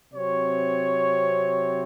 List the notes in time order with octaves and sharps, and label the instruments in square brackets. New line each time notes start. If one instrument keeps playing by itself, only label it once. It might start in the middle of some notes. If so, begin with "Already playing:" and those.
[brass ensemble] C3 F#3 C4 C#5